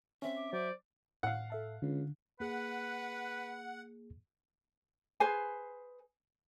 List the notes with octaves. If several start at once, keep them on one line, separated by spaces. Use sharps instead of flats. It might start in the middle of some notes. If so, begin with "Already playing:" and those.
C4 C#4 E5
D6
F#3 C5 D5
A2 F5 F#5
A4 E5 A5
C#2 D3
A#3 G#4 B4 F#5
G#4 B4 C5 G#5